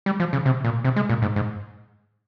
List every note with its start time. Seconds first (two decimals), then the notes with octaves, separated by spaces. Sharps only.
0.06 G3
0.20 F3
0.33 C#3
0.46 C3
0.64 A#2
0.84 C3
0.96 G#3
1.09 A#2
1.22 G#2
1.36 G#2